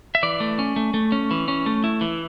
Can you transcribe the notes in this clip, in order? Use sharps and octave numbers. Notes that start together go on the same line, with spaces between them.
E5
E3 D5
A3
C#4
A3
A3
C#4
E3
C#4
A3
E4
E3